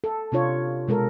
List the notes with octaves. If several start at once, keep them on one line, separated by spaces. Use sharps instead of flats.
A4
C3 D4 F4 C#5
B2 G#3 A4 A#4